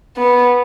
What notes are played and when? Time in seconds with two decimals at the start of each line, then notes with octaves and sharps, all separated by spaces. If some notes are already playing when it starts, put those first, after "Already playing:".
0.17 B3